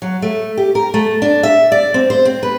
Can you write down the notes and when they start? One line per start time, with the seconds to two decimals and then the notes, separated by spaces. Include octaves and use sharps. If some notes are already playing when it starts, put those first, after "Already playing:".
0.02 F#3
0.22 A3
0.58 G4
0.75 A#4
0.94 A3
1.22 D4
1.43 E5
1.72 D5
1.94 C4
2.10 C5
2.25 C4
2.43 B4